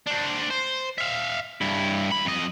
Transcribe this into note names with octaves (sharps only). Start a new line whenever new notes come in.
D4 C5
C5
E5 F5
G2 E4
E2 B5
F2 D#5